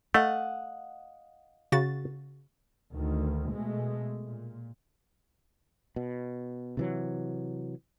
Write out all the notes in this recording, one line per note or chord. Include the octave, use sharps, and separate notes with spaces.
A3 D#5 F5 F#5
C#3 F#4 A6
D2 D#3
B2 G#3 A3
A#2
B2
C3 E3 F#3